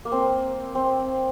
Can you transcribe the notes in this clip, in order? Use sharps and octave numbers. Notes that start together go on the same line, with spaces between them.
A#3
C4
C4